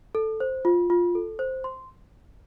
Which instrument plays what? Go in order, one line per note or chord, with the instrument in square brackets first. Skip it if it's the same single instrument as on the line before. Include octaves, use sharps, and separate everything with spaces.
[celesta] A4
C5
F4
F4
A4
C5
C6